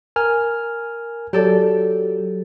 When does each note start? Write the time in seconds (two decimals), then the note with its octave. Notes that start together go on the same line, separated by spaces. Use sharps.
0.16 A#4 G#5 F6
1.33 F#3 G4 A4 D5